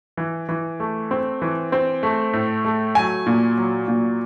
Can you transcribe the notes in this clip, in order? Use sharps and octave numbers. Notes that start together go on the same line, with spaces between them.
E3
E3
A3
C4
E3
C4
A3
A2
A3
F#3 G#5
A#2
F#3
A#2